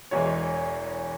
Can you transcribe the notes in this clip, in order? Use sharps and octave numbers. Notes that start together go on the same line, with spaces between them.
E1 E2 E3 G#3 C#5